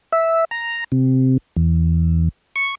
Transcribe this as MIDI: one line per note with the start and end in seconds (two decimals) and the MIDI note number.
0.12 0.45 76
0.51 0.84 82
0.92 1.37 48
1.56 2.29 40
2.56 2.75 85